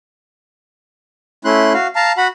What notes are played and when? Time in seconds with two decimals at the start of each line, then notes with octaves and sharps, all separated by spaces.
1.45 A3 C#4 E4 C6 F#6
1.74 F#4 F5
1.96 F5 A5 A#5
2.17 F#4 F#5 B5